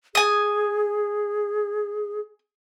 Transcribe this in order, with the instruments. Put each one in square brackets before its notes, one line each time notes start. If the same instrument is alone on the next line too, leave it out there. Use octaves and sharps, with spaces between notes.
[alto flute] G#4 [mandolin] G#5 D#6